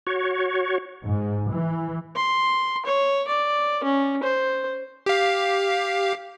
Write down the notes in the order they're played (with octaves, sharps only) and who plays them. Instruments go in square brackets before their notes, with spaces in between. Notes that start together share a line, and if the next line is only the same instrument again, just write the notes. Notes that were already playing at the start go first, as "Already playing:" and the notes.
[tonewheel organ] F#4 C#5
[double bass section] G#2
E3
[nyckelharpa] C6
C#5
D5
C#4
C5
[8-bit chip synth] G4 F5